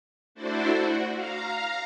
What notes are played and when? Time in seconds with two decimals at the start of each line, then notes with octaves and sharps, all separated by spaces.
0.35 A3 D4 E4 F#4 C5 D5
0.75 F#4
1.13 F5 A#5